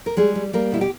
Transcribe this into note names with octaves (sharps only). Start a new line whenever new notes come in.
A#4
G3 G#3 G#4
G3
G3 A#3 A#4
B2 E4
G4